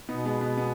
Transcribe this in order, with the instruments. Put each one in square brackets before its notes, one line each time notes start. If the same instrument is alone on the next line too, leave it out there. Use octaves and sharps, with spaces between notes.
[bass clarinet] B2 [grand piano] B3 D#4
[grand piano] G#3 B3
G#3 B3
G#3 B3